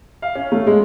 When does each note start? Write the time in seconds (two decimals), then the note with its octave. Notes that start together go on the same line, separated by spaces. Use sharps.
0.22 F5
0.35 C#4
0.52 A3
0.67 G#3